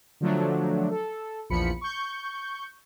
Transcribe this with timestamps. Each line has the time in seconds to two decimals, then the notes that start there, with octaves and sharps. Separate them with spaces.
0.21 D3 F3 F#3 A3 D4
0.90 A4
1.50 A#1 E2 F3 B5 C#7
1.81 C#6 G6